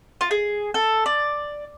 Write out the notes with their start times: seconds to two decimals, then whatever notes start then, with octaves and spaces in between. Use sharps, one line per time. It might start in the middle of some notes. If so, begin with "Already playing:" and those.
0.21 F4
0.31 G#4
0.74 A4
1.06 D5